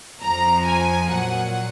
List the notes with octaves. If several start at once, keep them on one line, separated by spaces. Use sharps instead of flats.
F2 F3 A#5
G#5
A#2 F#3 F#5